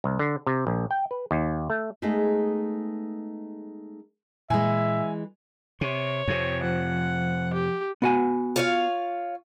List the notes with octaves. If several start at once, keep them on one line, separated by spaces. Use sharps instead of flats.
C2
D3
C3
A#1
G5
B4
D#2
A3
G#3 A3 B3 D#4 G#4
A#2 E3 G#3 E5 G#5
C3 C#5
F2 C3
F3 F#5
G4
B3 F#4 G#5
F4 C#5 F5